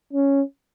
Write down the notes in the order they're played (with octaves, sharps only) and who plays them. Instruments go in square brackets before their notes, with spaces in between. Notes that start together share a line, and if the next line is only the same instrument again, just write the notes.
[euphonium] C#4